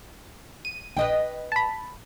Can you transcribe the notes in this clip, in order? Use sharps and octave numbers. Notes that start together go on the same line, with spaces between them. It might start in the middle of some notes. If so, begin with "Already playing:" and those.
D#7
A#1 B4 D#5 G5
A5 B5